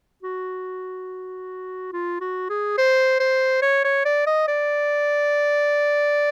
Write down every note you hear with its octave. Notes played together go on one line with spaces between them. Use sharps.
F#4
F4
F#4
G#4
C5
C5
C#5
C#5
D5
D#5
D5